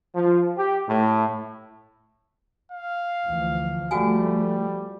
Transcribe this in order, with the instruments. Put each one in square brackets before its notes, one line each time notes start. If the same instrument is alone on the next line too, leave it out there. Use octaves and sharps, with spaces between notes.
[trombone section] F3
G4
A2
[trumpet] F5
[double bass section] D2 E3 F3
[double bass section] F3 A3 [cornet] G3 [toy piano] F#4 F#5 G#5